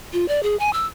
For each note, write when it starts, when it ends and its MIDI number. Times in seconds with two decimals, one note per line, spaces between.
0.13 0.26 65
0.28 0.41 74
0.43 0.56 68
0.60 0.71 80
0.73 0.86 88